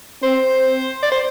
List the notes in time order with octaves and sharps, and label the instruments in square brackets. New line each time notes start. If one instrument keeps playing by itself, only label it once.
[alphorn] C4 [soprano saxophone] C5
[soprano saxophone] D5
C5